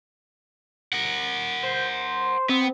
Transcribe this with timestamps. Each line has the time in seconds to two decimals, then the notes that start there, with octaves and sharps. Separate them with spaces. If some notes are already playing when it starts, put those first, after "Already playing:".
0.93 A#4 F#5
1.63 C5
2.49 B3 C4